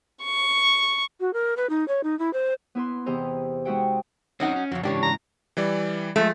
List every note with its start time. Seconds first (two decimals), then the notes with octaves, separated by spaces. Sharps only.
0.23 C#6
1.20 F#4
1.33 A#4
1.57 B4
1.69 D#4
1.88 C#5
2.03 D#4
2.19 E4
2.33 C5
2.75 B3 E4 B4 C6
3.06 E2 C3 E3 C5 D#5 A#5
3.65 G#3 D#4 F#4 E5 F#5 G5
4.40 F#3 C4 C#4 D#4 F#4 F#5
4.56 C#4
4.72 F2 C#3 F#3
4.83 G#2 C#3 E3 D4 G4 C#5
5.03 A#5
5.57 E3 G3 D5
6.16 F3 G#3 A3